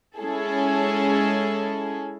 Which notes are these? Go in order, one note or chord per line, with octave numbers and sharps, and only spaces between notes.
G#3 C#4 E4 G#4 A4